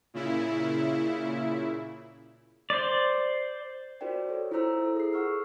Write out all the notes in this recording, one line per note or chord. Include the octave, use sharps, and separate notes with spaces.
A#2 C#3 E4
C5 D5
F4 F#4 A#4 C5 D5 G5
A4 C#5
E4 F4 A4 C5 A#5 E6
E4 A4
G#4 C7
F4 A#4 F#5 C#6 E6 F6